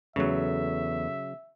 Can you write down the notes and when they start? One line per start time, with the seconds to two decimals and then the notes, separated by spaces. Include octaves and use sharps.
0.16 E2 C#3 F#3 A3 E5